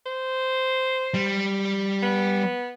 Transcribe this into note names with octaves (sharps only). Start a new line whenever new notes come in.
C5
G3
B3